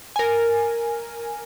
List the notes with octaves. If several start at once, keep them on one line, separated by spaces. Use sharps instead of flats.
A#4 G#5